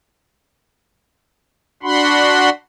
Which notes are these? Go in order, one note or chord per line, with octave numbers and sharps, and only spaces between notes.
D4 F#4 F#5 B5 C6